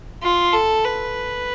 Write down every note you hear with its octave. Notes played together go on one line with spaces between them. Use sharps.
F4
A4
B4